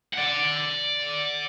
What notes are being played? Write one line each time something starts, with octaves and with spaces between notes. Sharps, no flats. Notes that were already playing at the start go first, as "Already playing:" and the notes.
D5 F#5